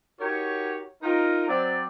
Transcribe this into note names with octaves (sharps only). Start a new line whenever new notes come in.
D#4 F#4 G4 A#4 C#5
D#4 F4 A#4
F#3 C4 D5